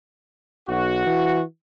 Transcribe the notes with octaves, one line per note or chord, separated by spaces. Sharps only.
B1 F#4
E3